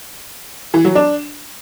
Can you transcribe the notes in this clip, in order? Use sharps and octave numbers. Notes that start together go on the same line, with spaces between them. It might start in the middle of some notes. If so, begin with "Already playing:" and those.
E3
F#3
D4